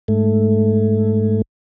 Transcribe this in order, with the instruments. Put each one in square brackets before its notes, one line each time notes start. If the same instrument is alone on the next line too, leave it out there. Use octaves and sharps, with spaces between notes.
[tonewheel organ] G#2 A3